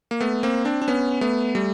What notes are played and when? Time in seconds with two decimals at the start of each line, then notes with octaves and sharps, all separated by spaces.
0.11 A#3
0.20 A3 B3
0.43 A#3 C4
0.65 C4 D4
0.82 D4
0.88 B3 C#4
1.21 A3 B3
1.55 G3 A3